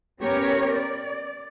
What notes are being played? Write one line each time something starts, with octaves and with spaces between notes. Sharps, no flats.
B3 C#4 G4 A#4 C#5
D5